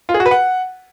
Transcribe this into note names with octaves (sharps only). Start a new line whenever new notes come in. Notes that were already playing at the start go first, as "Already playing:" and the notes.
F4
G#4
F#4
B4
F#5